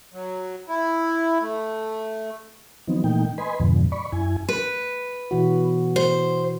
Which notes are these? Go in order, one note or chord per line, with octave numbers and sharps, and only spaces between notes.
F#3
E4
A3
D#3 F3 F#3 B3 C4 D#4
A#2 E3 A3 A#3 D#4 G5
B4 D#5 G#5 B5 C6
F2 G#2 B2 D3 F3
D5 B5 C#6
F#2 E4 G#5
B4
B2 E3 F#4
C5